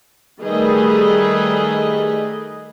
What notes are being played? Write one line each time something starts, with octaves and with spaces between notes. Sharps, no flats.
D#3 G3 A3 G#4 B4 D#5